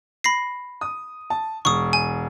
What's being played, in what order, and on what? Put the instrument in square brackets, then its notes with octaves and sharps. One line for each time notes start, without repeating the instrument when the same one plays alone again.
[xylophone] B5 A#6 C7
[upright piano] D#6
A5
[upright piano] E1 [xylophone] C#6 D#6
[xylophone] G#5